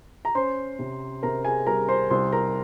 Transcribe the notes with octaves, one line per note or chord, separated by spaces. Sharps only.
A#5
C#4 C5 C6
C3
C3 A#4 A#5
G#4 G#5
G3 A#4 A#5
C5 C6
C2 C5 C6
A#4 A#5